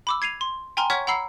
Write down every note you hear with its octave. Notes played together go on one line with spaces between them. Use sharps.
B5 D6 E6
G#6 C7 D#7 F7
C6
G5 G#5 A#5 C6 F6
C#5 F#5 C#6 F6 G#6 B6
F#5 A#5 B5 E6 C7